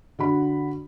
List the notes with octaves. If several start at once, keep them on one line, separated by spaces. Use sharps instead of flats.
D3 F#4 B5